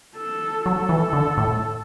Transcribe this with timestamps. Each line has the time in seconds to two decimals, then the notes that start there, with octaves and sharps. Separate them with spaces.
0.17 A4
0.66 F#3 A4
0.89 E3
1.13 D3
1.37 A2